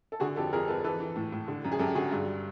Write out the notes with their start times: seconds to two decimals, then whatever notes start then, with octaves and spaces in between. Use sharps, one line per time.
0.12 A4
0.20 D3 F#4 G#4
0.36 F2 G4 A4
0.53 F2 G#4 A#4
0.68 F2 A4 B4
0.84 E3 A4 B4
1.00 E3
1.16 A2
1.33 A2
1.48 D3
1.64 F#2
1.72 G#4
1.79 F#2 G4 A4
1.95 D3 F#4 G#4
2.11 G2